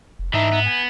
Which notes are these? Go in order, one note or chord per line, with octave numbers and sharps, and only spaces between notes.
F1
G#2 E3 D4 D#4 D#5 E5
B3
G#5